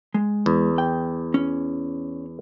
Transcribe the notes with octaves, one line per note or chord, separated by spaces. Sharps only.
G#3
E2
G5
C#4